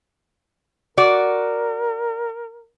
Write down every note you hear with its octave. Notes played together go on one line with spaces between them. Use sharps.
F#4 A#4 D5